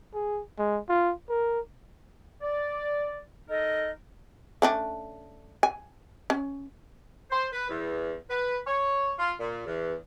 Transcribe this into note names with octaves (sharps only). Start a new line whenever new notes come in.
G#4
G#3
F4
A#4
D5
D#4 A4 A#4 D#5
A3 C#4 D4
G#5
C#4
C5
B4
E2
B4
C#5
F4
A#2
E2